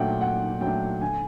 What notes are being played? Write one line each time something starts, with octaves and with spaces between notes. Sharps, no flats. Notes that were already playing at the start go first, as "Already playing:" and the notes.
Already playing: A#2 F#3 A3 D4 F#5 G5
A#2 F#5
F#3 A3 D4 G5
D3 G#5